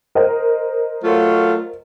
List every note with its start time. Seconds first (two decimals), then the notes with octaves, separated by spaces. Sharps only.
0.15 A#4 C5 D#5
1.04 F#3 A3 F4